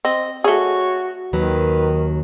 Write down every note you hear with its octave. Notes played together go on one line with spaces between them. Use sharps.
C4 D#5
A3 F#4 G#4 C#5
D#2 D#3 F#3 B4